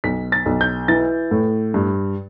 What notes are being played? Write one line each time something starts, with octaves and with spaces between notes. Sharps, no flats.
B1 B6
A6
B1
G6
E3 A6
A2
G2